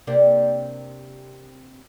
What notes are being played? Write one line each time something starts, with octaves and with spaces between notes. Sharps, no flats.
C3 A#3 D4